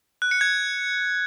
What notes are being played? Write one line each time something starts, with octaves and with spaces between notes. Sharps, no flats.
F#6
C#7
G#6